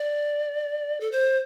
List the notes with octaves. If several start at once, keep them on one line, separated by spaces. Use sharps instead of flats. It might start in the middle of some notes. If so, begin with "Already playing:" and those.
Already playing: D5
A4
C5